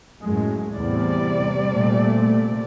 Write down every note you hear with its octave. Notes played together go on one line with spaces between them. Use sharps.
F#2 A2 G#3
E2 A2 C3 G3 D5
A#2 A3